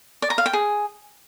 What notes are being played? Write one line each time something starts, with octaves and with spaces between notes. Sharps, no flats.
D5
A#5
F5
G5
G#4